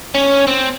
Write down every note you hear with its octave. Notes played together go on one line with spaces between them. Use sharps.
C#4
C4